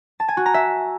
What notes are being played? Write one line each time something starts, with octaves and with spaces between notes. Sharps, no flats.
A5
G#5
F#4
A#5
E5